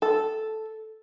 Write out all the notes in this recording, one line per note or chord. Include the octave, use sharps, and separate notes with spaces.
A4